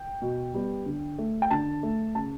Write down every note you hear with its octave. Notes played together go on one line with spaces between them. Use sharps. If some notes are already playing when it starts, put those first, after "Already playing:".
Already playing: G5
B2
G3 B3
D3
A3
G5
D3 A5
A3
C#3 A5